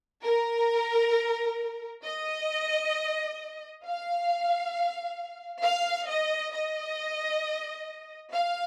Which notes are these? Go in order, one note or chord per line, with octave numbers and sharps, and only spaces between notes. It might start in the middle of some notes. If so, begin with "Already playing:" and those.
A#4
D#5
F5
F5
D#5
D#5
F5